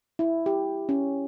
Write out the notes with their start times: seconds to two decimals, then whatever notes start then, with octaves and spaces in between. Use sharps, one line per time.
0.19 E4
0.46 G4
0.89 C#4